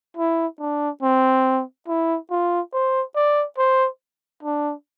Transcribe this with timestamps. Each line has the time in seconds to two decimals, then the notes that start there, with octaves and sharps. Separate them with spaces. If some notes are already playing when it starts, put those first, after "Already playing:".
0.17 E4
0.60 D4
1.02 C4
1.88 E4
2.31 F4
2.73 C5
3.15 D5
3.58 C5
4.43 D4